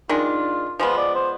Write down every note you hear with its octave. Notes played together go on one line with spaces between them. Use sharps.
D#3 G#3 D4 F4
F3 G#3 B3 F4
D5
C5